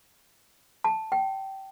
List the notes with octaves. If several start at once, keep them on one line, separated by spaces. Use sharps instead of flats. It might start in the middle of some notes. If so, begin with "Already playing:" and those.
A5
G5